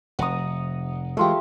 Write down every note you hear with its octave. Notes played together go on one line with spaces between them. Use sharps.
F1 F#5 A#5 D#6
E3 G#3 A3 F4 G4